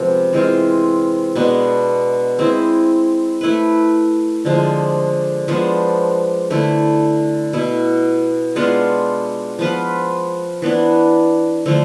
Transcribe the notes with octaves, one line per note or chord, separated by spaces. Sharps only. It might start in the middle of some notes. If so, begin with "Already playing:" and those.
Already playing: C3 F3 G#3 B3
E3 G#3 C4 F4
B2 G#3 B3 D4
G#3 C4 E4
A3 E4 B4
D3 F3 G#3 D4
F3 G#3 B3 D4
D3 A3 E4 A4
B2 B3 E4
G#3 B3 D4 F4
F3 B3 F4 B4
E3 B3 D4
D3 F3 A3